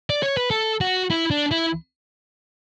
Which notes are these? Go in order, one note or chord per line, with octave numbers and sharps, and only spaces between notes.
D5
C#5
B4
A4
F#4
E4
D4
E4